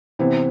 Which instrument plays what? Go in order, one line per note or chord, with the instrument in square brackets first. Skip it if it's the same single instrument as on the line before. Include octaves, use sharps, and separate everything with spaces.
[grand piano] C3 E3 B3 [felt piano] C4